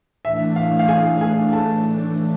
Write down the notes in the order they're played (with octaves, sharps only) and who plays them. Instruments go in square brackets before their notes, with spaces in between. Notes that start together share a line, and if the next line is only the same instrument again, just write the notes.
[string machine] A2 E3 A3 D4 [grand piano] E5
[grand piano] F5
F5
G#4 G#5
G#4 G#5
A4 A5